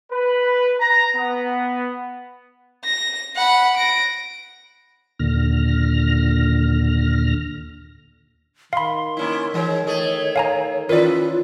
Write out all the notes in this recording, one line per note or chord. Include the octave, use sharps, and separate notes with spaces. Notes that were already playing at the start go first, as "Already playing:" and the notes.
B4
A#5
B3
A#6
F#5 B5
A#6 D7
D#2 A#2 D3 F6 A#6
D#3 F5 B5 C6
A#3 C#4 E4
E3 G#3 C#5
A3 G#4
F5 G#5 A#5
D#3 C#4 E4 F4 A#4 B4 D5